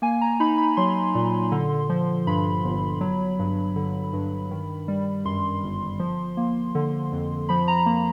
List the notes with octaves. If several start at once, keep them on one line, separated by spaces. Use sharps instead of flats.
A#3 G#5
A#5
D#4 B5
B5
F#3 C6
A#2
D3
F3
G2 B5
G1
F#3
G2
D3
G2
D#3
G3
F#2 C6
G1
F3
A#3
D3
F2
F3 B5
A#5
A#3